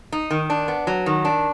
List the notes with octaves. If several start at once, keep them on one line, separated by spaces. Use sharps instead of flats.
D#4
D#3
D4
B3
F#3
D#3
D4